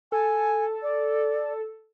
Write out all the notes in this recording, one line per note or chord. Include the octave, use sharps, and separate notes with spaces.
A4 G#5
D5